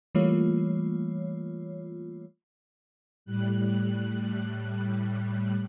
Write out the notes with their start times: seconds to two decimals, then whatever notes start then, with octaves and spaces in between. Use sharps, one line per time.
0.15 E3 G3 A3 A#3 F4 C#5
3.25 A2 G3 F#6